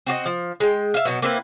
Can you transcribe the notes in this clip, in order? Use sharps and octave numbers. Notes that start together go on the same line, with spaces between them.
C4 F#4 D5 D#5
F3
G#3 G5
E5 F5
B2 F#3
A#3 C4 E4 B4